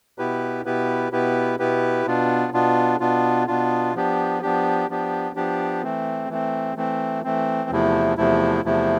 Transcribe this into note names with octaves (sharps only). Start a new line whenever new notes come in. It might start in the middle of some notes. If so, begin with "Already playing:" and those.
B2 B3 E4 G4 B4
B2 B3 E4 G4 B4
B2 B3 E4 G4 B4
B2 B3 E4 G4 B4
B2 B3 D4 F4
B2 B3 D4 F4
B2 B3 D4 F4
B2 B3 D4 F4
F3 B3 D4 G4
F3 B3 D4 G4
F3 B3 D4 G4
F3 B3 D4 G4
E3 A3 C4
E3 A3 C4
E3 A3 C4
E3 A3 C4
E2 C3 F3 A3 E4
E2 C3 F3 A3 E4
E2 C3 F3 A3 E4